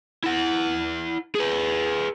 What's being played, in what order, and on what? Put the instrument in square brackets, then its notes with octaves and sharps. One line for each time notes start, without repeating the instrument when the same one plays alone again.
[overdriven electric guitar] E4 F#5
G#4 B4